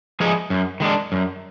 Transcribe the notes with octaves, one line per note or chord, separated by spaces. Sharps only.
F3 G#3 D#4 G#4
F#2
D#3 G#3 D4
F#2